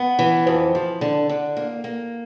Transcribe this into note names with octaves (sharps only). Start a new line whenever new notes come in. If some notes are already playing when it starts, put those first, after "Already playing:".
Already playing: B3
E3
F2
F3
D3
D3
A#3
A#3